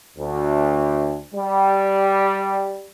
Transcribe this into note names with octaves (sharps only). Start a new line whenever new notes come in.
D2
G3